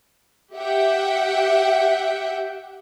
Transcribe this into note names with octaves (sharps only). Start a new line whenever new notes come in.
G4 E5 F#5 G5